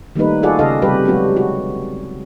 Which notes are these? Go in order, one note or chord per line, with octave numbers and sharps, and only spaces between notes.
D#3 G3 A3 A#3 D#4 B4
F4 F#4 G#4 A4 D5 F#5
C#3 D4 A4 D#5 F5
C3 G3 G4 B4
F#3 G#3 B3 D4 F#4
F#4